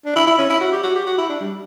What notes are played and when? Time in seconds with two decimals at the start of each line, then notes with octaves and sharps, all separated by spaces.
0.05 D4
0.15 E4
0.27 E4
0.38 C#4
0.49 E4
0.61 F#4
0.72 G4
0.83 F#4
0.95 G4
1.06 F#4
1.18 E4
1.29 D4
1.40 G3